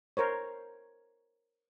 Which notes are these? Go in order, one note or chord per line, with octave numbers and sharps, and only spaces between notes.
A#4 C5 C#5